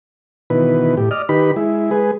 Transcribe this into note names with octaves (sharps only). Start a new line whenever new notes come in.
B2 D#3 E3 B4
A2 G4
D5 D#5 F6
D#3 D#4 G4 B4 B5
G#3 E4
G#3 G#4 B4